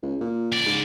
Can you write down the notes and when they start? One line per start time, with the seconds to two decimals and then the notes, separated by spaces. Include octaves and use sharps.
0.03 C#2
0.21 A#2
0.52 C#2 D5
0.66 G#2